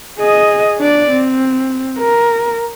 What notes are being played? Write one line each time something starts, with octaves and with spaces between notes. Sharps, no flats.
G#4 D#5
D4 D5
C4
A#4